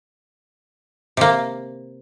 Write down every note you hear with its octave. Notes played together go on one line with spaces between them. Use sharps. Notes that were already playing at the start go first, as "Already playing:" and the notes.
C3 A#3